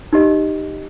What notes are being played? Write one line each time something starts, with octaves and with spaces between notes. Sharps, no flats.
D#4 G4 D#5